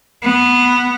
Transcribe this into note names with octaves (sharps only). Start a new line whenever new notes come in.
B3